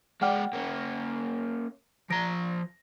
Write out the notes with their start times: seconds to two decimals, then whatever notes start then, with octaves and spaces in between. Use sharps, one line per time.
0.22 G#3 D5 F#5 G5 F6
0.53 A#3 C#4
2.10 F3 A#5 A#6 D7